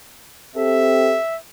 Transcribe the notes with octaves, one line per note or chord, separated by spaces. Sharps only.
C4 G4 A4 E5